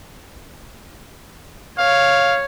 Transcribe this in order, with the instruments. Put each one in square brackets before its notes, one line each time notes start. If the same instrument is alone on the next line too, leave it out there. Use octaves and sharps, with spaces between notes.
[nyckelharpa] C#5 [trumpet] F5